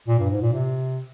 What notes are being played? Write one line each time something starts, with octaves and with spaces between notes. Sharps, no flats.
A#2
G2
G#2
A#2
C3